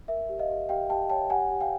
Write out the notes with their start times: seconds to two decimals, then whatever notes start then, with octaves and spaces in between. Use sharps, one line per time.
0.08 A#4 E5
0.29 G4
0.39 D#5 F5
0.49 G4
0.69 G4 F5 G5
0.89 G4 G5 A5
1.10 C#5 G5 A5
1.30 G4 F#5 G#5
1.51 G4
1.60 F5 G5